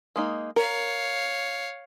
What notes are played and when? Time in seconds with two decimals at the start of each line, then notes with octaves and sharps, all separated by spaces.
0.16 G#3 A#3 D#4
0.56 A#4 C#5 F5